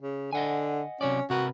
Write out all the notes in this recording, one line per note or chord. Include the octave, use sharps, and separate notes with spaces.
C#3
D3 D#5 F#5 G#5
C3 F#3 C#4 D5
C3 F#4 A#4 B4